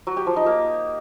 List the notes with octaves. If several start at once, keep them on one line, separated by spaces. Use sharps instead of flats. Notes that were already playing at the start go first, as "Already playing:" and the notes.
F#3
G4
F3
D#4
A#3